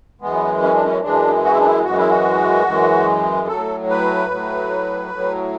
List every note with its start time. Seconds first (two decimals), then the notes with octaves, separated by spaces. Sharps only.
0.21 F#2 E3 G#3 B3
0.63 C#4
0.74 D4
0.85 C#4
1.03 F#2 E3 G#3 D4
1.44 F#4
1.51 E4
1.59 D4
1.66 E4
1.84 F#2 E3 G#3 F#4
1.98 E4
2.10 F#4
2.67 F#2 E3 G#3
3.48 A2 F#3 A4
3.90 B4
4.30 A2 F#3
5.11 A2 F#3